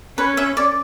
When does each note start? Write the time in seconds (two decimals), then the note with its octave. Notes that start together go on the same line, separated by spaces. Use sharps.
0.18 C#4 B4
0.37 E5
0.57 D5